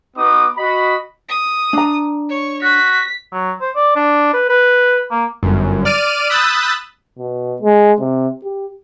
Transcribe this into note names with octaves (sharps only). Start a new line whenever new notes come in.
B3 D#4 F#4 B4 D6 D#6
F#4 D#5 B5
D#6
D4 A#5
C#5 C#6
F#4 B6
F#3
C5
D5
D4
B4
B4
A#3
G1 F#2
D5 F6 D7 D#7
B5 D#6 E6 F#6 G6 A6
B2
G#3
C3
G4